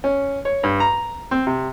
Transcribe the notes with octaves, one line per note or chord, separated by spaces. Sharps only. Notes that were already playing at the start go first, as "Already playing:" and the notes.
C#4
C#5
G2
A#5
C4
C3